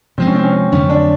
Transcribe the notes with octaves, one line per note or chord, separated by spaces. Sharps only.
C3 F3 G#3 C4
C#4
C4
C#4
C4
F2 D3 F#3 A3 C#4
D4